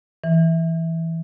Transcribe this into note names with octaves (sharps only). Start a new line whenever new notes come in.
E3